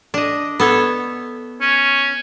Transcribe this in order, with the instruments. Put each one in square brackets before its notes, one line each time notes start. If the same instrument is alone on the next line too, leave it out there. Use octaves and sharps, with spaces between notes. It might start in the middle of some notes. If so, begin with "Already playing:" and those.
[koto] D4 D#5
B3 A4 C#5
[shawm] C#4